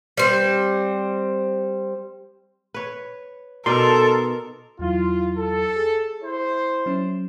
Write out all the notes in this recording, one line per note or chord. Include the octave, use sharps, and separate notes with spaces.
G3 C4
B4 C#5
B2 D#4 A4 A#4 D5 C6
E2 F#3 E4 F4
A4
G#4
E4 C5
F#3 C#4